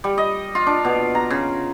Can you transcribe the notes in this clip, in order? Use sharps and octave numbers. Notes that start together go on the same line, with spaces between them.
G3
D#5
F4
D4
B2
A#5
C#3